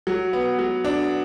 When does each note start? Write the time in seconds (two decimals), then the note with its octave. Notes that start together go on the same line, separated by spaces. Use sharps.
0.07 F#3
0.33 B3
0.59 F#3
0.84 D4